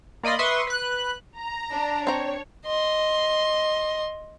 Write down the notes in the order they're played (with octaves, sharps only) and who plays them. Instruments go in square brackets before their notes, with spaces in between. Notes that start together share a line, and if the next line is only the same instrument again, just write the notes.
[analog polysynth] A#3 D5 D#5 B5 C6
B4 E5 C6 C#6 D#6
B4 F#6
[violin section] A#5
[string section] D4
[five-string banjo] C4 A#5 [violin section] C#5
[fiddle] D#5 C6